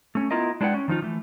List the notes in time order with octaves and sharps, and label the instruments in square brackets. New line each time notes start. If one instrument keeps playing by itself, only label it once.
[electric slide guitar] A3 C#4
B3 E4 F4 A#4 D#5
G#3 D4 E4 B4 F#5 G5
C#4
D#3 F3 D#4 F4
E3 A3